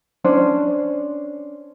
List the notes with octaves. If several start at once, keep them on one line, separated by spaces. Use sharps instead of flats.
C#4 D4 C5